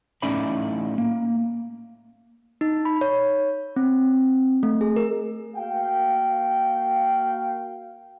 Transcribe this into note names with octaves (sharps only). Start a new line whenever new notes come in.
A2 C#4 D#4 D5 E5 B5
A#3
D#4
B5
C#5
C4
A3
G#4
A#4
A#3 F#4 F5 G5